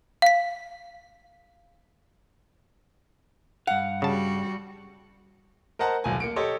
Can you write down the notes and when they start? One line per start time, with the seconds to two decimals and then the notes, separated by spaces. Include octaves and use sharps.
0.22 F5 B6
3.67 G2 F5 F#5
4.02 C#3 G3 F#4 A5
5.79 A#4 C5 D#5 F#5 A5 A#5
6.04 D#1 B1 G#5
6.20 A#3 C#7 D7
6.36 G4 A4 C#5 D#5